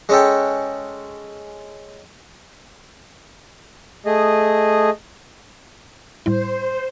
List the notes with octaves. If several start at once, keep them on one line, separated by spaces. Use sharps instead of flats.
G#3 C#4 A4 G5
A3 G#4 D#5
A2 G3 E4 C5